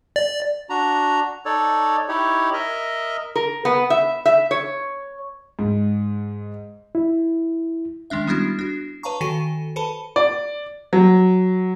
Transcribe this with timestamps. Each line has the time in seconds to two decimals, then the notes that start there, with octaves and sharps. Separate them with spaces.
0.16 D5
0.70 D4 F#4 A#5
1.46 D#4 A4 C#5 D5
2.09 D#4 E4 G4 C#5
2.53 A#4 D#5 E5
3.36 A#4
3.65 B3
3.90 E5
4.26 E5
4.51 C#5
5.59 G#2
6.95 E4
8.10 D#3 G#3 C#4 D4 E5
8.27 G3 B3 D4 E4 F#4
8.59 D4 F#4
9.03 B4 C#5 F5 A5 A#5 C#6
9.21 D#3 F#4 A4 G#5 D#7
9.76 A4 B4 C5 A5 B5
10.16 D5
10.93 F#3